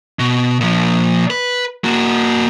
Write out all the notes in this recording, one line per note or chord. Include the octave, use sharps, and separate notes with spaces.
B2
A#2 F3
B4
A#3 F#4